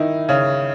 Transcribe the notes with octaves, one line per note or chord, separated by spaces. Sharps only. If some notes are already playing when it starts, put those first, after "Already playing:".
Already playing: D#3 D#4 E4
C#3 C#4